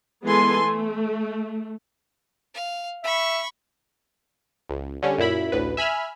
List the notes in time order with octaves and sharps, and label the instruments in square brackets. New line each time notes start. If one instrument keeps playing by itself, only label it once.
[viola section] E3 G#3 B3 A4 G#5 C6
A3
[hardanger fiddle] F5
[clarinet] E5 [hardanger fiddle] B5 C#6
[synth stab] C#2
D3 G3 C#4
F#2 A#2 E4 B5
A1 D2 B4
E5 G#5 B5 E6 F6